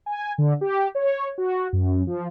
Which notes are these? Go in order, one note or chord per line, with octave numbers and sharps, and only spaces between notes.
G#5
D3
G4
C#5
F#4
F#2
F3